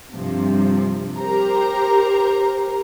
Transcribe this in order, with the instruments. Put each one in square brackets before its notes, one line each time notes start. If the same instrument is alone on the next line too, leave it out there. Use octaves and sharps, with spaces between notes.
[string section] G2 C3 F3
G4 A#4 C5 A#5